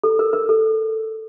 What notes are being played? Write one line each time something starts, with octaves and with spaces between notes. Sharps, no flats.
A4
A#4
A#4
A4